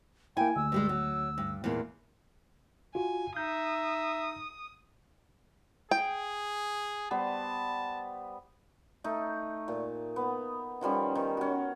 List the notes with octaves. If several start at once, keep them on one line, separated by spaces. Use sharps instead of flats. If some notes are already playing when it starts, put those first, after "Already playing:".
A#3 E4 G5 G#5
D2 E6
G2 G3 G#3
F#3
G2
E2 A#2
F4 F#4 G#5
D#4 E5 D#6 G6
G#4 G5
G3 B3 C5 A5
A3 D#4
A#2
B3
D#3 F3 G3 C#4
D#3
C#4 F#4